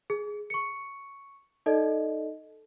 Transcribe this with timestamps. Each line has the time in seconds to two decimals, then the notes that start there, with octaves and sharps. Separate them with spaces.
0.10 G#4
0.50 C#6 C#7
1.66 D#4 A4 D5 D#5